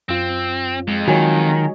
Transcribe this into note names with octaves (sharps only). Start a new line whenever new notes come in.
F#2 C4 F4
F2 G#3
D#3 F#3 F4 F#4 C#5 G#5